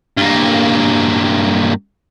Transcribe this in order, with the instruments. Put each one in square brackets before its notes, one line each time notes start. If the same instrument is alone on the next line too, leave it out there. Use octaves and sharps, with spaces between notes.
[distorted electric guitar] G2 A#3